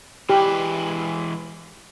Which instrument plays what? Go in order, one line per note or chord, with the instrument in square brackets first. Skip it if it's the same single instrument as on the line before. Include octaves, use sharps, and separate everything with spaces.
[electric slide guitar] E3 G#3 B4 [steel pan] G4